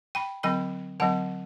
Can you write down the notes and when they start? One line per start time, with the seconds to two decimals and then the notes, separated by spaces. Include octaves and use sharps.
0.15 G5 B5
0.43 D3 F#3 C4 G5 B5
1.00 D3 F#3 C4 F#5 A5